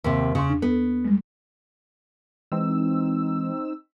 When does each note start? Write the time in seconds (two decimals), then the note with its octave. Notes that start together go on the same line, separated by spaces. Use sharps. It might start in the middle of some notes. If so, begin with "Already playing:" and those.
0.04 D#2 C3
0.35 E2 C#3 C6
0.50 D4
0.62 B3 A4
1.05 G3 G#3
2.52 E3 G#3 C4 D#4 E6